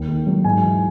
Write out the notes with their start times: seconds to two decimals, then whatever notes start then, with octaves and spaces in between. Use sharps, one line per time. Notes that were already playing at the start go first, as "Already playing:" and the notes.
Already playing: D#2
0.08 D#3
0.27 F#3
0.44 G#2 G#5
0.63 E3